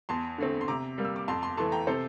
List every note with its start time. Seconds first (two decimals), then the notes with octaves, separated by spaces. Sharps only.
0.09 E2 A5 C6
0.38 D3 A3 C4
0.61 C6
0.68 C3 A#5 D6
0.98 G3 A#3
1.05 E6
1.16 D6
1.28 F2 A5 C6
1.42 A5 C6
1.57 E3 A3 A5 C6
1.72 G5 A#5
1.87 C3 A4 C5